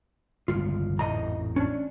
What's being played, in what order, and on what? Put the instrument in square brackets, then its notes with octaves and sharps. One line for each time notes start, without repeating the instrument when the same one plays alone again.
[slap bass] G1 C#2 A2 [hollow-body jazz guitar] F4
[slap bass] A1 F2 G#2 [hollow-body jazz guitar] D#5 A#5
[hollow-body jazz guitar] C#4 D4